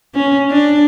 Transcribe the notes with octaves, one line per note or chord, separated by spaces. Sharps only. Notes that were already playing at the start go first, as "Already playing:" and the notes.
C#4
D4